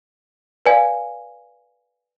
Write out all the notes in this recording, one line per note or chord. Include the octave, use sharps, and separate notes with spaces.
B4 D5 F5 G#5